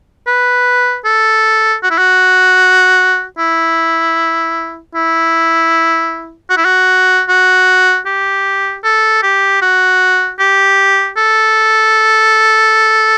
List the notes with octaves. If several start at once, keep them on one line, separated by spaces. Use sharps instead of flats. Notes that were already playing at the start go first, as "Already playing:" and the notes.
B4
A4
F#4
E4
F#4
E4
E4
F#4
E4
F#4
F#4
G4
A4
G4
F#4
G4
A4